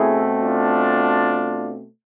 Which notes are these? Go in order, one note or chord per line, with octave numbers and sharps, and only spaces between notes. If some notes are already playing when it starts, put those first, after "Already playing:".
Already playing: B2 A3 C4 E4 G#4
D4 F4